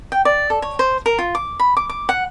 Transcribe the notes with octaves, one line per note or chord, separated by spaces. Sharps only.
G5
D5
A4
C#5
C5
A#4
F4
D6
B5
D6
D6
F#5